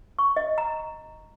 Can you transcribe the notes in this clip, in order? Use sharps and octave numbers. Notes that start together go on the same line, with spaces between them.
C#6
D#5
A#5